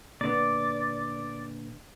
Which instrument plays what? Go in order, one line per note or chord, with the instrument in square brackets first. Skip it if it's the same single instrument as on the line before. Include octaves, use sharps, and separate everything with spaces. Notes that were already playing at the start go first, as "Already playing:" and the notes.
[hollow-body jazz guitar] A#2 D3 B3 [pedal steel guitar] D5